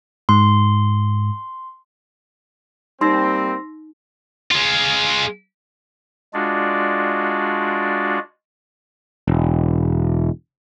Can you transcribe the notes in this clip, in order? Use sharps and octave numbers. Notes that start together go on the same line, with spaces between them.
G#2 C6
G3 A#3 C4 D#4 C6 E6 A#6
G#3 F4
G#3 D4 F4 F#4 D5
E1